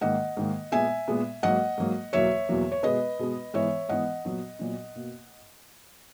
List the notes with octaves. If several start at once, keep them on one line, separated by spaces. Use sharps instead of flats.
G#2 D#3 A#3 D#5 F#5
G#2 D#3 A#3
A#2 G#3 B3 E5 G#5
A#2 G#3 B3
G#2 F#3 A#3 D#5 F#5
G#2 F#3 A#3
E2 B2 F#3 A#3 C#5 E5
E2 B2 F#3 A#3
C#5
B2 G#3 B3 B4 D#5
B2 G#3 B3
G#2 E3 B3 C#5 E5
G#2 E3 B3 D#5 F#5
A#2 F#3 B3
A#2 F#3 B3
B2 A#3